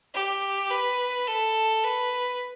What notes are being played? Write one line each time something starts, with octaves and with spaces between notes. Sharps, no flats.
G4
B4
A4
B4